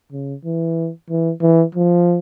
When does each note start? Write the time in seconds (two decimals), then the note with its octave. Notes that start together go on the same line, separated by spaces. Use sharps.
0.12 C#3
0.45 E3
1.10 E3
1.42 E3
1.75 F3